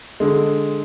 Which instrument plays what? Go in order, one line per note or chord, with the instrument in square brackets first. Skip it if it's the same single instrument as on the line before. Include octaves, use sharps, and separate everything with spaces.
[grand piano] D3 G#3